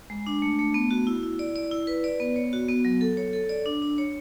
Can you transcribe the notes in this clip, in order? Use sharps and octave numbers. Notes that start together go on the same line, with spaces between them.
G#3
D4
A3
A3
B3
F#4
E4
E4
D5
D5
E4
B4
D5
B3
C#5
F#4
B3
F#3
A4
C#5
A4
D5
D4
D4
C#5